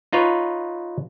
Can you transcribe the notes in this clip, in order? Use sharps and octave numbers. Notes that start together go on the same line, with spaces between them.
D#4 F4 B4 C#5